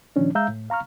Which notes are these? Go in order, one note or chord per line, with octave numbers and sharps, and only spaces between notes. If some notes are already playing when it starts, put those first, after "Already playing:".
A#2 D#3 F3 C#4 D4
G#3 E5 F5 A#5 E6 G6
A2
F5 A#5 C#6 F6